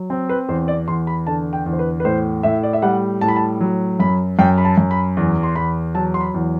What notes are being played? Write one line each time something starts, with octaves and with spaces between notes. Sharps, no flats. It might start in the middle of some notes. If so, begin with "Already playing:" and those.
Already playing: F#3
C4
B4
E2 C5
D5
E2 C6
B5
D3 A5
G5
E2
C5
B4
B4
A2 C5
A2 E5
D5
E5
G3 F#5
A2 A5
B5
A5
F#3
F#2 B5
F#2 G5
B5
A5
F#2
B5
E2
C6
E2 B5
F#3 A5
C6
B5
E2